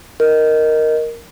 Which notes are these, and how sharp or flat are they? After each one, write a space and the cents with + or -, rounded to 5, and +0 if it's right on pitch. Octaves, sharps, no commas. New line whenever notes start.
A#4 +0 D#5 +0